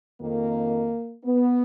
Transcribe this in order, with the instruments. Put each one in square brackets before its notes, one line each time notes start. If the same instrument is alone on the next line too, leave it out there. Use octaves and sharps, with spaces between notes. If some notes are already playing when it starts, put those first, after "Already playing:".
[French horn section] F2 D#3 A#3
B3